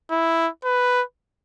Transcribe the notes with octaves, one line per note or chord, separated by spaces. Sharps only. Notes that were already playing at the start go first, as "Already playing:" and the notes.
E4
B4